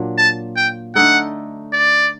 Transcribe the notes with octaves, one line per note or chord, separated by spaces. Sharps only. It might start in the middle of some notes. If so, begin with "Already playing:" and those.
Already playing: A#2 F#3 A#3 D4
A5
G5
D3 A3 D#4 A4 F#5
D5